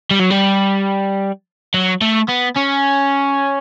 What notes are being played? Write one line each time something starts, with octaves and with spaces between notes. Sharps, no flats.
G3
F#3
G3
F#3
A3
B3
C#4